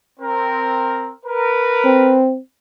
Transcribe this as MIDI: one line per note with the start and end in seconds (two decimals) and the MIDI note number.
0.20 1.11 60
0.20 1.11 70
1.24 2.18 70
1.24 2.18 71
1.85 2.39 60